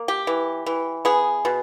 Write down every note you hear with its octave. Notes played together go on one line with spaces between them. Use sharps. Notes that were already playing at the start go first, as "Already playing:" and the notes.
Already playing: A#3
G4
E3
E3
B3 G#4
B2